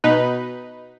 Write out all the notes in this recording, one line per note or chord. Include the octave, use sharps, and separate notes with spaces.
B2 D#4 B4